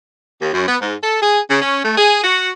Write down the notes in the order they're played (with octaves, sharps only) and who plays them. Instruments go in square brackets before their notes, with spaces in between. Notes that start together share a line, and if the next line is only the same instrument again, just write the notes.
[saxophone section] D#2
F#2
B3
G#2
A4
G#4
C#3
C#4
A3
G#4
F#4